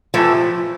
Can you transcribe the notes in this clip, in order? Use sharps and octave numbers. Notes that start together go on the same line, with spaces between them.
C3 E3 F3 A3 E4 A4